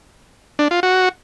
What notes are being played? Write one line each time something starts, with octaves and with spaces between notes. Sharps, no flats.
D4
F4
F#4